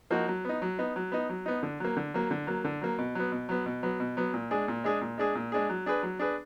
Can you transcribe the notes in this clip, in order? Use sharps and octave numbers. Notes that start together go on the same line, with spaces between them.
F3 A#3 D#4 F#4
F#3
B3 D#4
F#3
B3 D#4
F#3
B3 D#4
F#3
B3 D#4
D3
F#3 A#3
D3
F#3 A#3
D3
F#3 A#3
D3
F#3 A#3
B2
F#3 B3
B2
F#3 B3
B2
F#3 B3
B2
F#3 B3
A#2
G#3 D4 G#4
A#2
G#3 D4 G#4
A#2
G#3 D4 G#4
A#2
G#3 D4 G#4
F#3
D4 G#4 B4
F#3
D4 G#4 B4